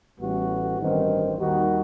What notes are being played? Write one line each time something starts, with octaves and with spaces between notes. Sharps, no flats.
A1 A2 G3 B3 F#4
A1 G2 D#3 G3 C4
D#2 D#3 G3 D#4 F#4